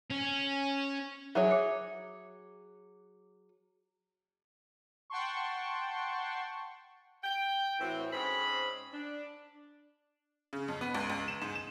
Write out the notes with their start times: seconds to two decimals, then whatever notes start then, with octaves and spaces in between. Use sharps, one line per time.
0.11 C#4
1.35 F#3 G#4 C#5 E5
1.51 D6 C#7
5.10 F#5 G5 A5 C6 C#6
7.23 G5
7.80 A2 E3 C4 F#4
8.11 G#2 C4 C#4 B5
8.93 D4
10.53 C#3
10.68 F2
10.81 B3
10.95 C#2
11.10 C#2
11.28 E7
11.42 G#2
11.55 E7